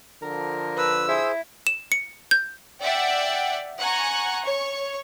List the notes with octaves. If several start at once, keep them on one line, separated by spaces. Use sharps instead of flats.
D3 F3 A#4
B4 E6
E4 G#4 C5
E7
C#7
G6
D5 E5 F#5 G5
F#5 G#5 A#5 C#6 F#6
C#5 C#6